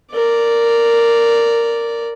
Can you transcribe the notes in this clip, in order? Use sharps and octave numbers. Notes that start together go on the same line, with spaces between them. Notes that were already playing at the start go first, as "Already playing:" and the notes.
A#4 D5